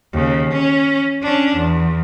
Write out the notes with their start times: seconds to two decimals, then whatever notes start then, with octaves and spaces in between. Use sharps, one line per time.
0.13 D#2 C#3
0.52 C#4
1.22 C#4 D4
1.56 E2